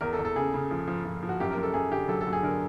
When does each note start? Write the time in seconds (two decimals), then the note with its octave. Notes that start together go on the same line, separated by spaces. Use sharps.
0.01 E2 A#4
0.13 A4
0.19 E2
0.25 A4
0.36 C#3 G#4
0.54 C#3
0.71 F3
0.88 F3
1.05 F3
1.23 F3
1.29 F#4
1.40 F#2 G4
1.51 A#4
1.57 F#2
1.63 A4
1.74 F#2 G#4
1.91 D3 G4
2.08 F#3 A4
2.21 A4
2.27 F#3
2.33 G#4
2.43 D3 A#4